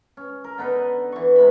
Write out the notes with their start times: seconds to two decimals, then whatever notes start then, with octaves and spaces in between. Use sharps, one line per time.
0.17 C#4
0.44 A#4
0.58 D3 B3 D#4 B4
1.12 E3 C#6
1.36 C3 G#3 B5